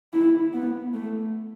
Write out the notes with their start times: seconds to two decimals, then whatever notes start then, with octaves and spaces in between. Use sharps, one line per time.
0.13 E4
0.54 B3
0.94 A3